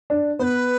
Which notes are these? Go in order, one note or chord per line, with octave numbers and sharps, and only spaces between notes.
D4
B3 B4 C5